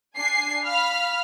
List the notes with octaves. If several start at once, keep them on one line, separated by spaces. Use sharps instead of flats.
D4 G#5 C7
F5 B5 F6 B6